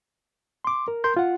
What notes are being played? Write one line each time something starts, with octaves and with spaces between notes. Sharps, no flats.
C6 D6
A#4
A#4 C6 G6
F4 F#5